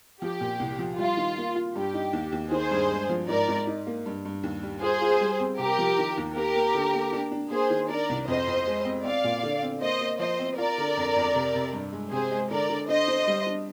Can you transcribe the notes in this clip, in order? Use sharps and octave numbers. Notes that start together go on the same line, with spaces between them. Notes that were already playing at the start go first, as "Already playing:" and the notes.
F3 G4
A#2
C2
F3
G3 F4
D#3
A#3
F4
G2 G4
D#4
D#2
D#2
D#3 G#4 C5
G2
G#3
F3
G#2 A#4 D5
G#2
D#4
A#3
G2
G2
D#2
G3
F4 G#4 C5
F4
G3
C4
C3 G4 A#4
F3
D#3
D#2
A#3 G4 A#4
A#3
D3
A#3
D4
D4
A#3 G#4 C5
D#3
D4 A#4 D5
C2
F2 C5 D#5
F2
G#3
C4
C4 D5 F5
A#2
D3
C4
A#3 C5 D#5
A#3
F3 C5 D#5
C4
F4 A#4 D5
D3
F2
F2
C3
C3
G2
G#3
C3 G#4 C5
G#3
D3 A#4 D5
D3
D4 C5 D#5
D4
G3
D4